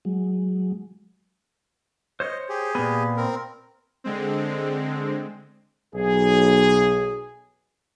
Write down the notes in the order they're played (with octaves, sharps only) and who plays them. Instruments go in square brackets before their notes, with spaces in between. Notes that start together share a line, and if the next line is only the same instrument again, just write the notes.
[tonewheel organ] F#3 G#3
[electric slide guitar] C5 C#5 [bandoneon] D#5
[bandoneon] G4 G#4
[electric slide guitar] A#2 B3
[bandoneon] C4 A#4
[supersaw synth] D3 G#3 C4
[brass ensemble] B1 G#4